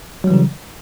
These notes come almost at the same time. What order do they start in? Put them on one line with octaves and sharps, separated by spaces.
F#3 G3 E3 C#3